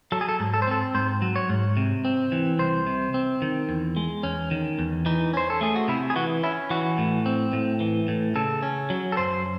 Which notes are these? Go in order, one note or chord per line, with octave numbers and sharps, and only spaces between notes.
F#3 A4
G#4
A4
G#2
A4
C5
C4 A4
G#2 C5
F#3
C#5
G#2
C3
C4
E3
C2 C5
C3
C4
D#3
E2
G#3
E2 C#4
D#3
E2
E3 D#4
C#4 C5
A4
A3 G#4
F#4
C3 E4
G#4
E3 F#4
C#4 E4
E3 F#4
A2
C4
A2
E3
A2
C#3 A4
C#4
F#3
A4
F#2 C5